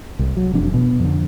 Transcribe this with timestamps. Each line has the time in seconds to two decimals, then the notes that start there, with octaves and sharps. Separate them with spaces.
0.19 C2
0.37 F#3
0.53 E1 F2 D4
0.74 B2
1.00 F2 D3